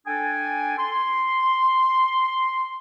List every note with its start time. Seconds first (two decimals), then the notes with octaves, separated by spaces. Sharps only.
0.07 D4 A4 G5 G#5
0.78 C6